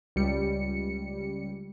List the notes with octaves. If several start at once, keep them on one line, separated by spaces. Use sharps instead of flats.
C#2 G3 C#7